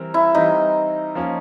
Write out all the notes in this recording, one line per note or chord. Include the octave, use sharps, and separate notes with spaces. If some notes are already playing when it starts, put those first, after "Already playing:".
Already playing: E3 G3 C4 A#4
E4
E3 G3 C4 D#4
F3 A#3 C#4 F4